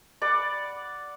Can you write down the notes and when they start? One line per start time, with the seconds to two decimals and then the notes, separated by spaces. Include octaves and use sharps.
0.22 D5 F#5 B5